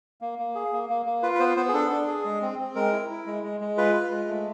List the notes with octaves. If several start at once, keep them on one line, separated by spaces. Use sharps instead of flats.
A#3
A#3
G#4
A#3
A#3
A#3
F4 B4
B4
B3 C5
B3 C5
G#4
D4 A4
D4
G#4
G#3
C4
C4
G#3 A#4
E4
E4
G#3
G#3
G#3
F4 B4
F4
G#3
A3